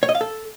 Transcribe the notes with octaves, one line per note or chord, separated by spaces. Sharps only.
C#5
D#5
F5
A4